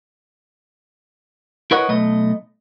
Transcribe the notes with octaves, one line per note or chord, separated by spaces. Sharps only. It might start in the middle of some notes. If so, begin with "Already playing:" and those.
E4 A#4 B4 C#5 D#5 F#5
B1 A3 D#5